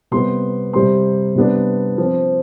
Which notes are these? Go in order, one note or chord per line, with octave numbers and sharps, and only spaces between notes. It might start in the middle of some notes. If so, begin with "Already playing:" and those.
C3 G3 B3 C6
C3 G3 C4 C6
C3 G3 B3 D4
F3 C4